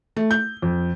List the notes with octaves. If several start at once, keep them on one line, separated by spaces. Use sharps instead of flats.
A3
G6
F2